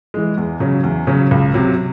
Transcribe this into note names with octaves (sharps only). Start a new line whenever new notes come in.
E3 G#3
E2
C#3 F#3 C#4
E2
C#3 F#3 C#4
C#2
C3 F#3